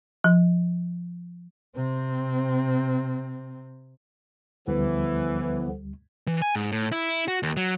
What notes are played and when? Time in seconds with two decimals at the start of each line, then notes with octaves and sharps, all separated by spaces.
0.24 F3
1.76 C3 C4
4.68 D2 D3 E3 F3 G3 B3
6.27 E3
6.42 G#5
6.55 G#2
6.72 A2
6.92 E4
7.28 F#4
7.43 D#2
7.57 F#3